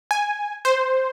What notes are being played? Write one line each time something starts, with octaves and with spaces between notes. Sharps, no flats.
G#5
C5